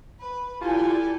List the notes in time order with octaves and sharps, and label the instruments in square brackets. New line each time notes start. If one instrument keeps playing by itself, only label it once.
[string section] B4
[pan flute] E4 [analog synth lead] F4 [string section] G4 A4 D5 [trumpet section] G#5